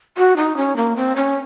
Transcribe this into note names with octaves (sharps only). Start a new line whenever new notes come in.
F#4
D#4
C#4
A#3
C4
C#4